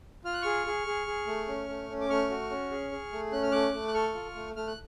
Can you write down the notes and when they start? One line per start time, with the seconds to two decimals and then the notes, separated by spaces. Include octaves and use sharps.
0.25 F4 F6
0.34 F#6
0.42 G#4 C#6 F6
0.66 G#4
0.87 G#4
1.07 G#4
1.27 A3
1.48 C#4
1.69 A3
1.90 C#4
2.01 D6
2.09 A3 C#6 F6
2.30 F#4
2.50 C#4
2.71 G#4
2.92 G#4
3.12 A3
3.32 C#4 F#6
3.43 F6
3.52 A3 D6 F#6
3.73 A3
3.88 F#6
3.94 A4 C#6 F6
4.15 F4
4.35 A3
4.56 A3 F6
4.67 F#6